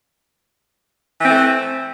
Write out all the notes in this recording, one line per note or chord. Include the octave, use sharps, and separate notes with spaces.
E3 A3 C4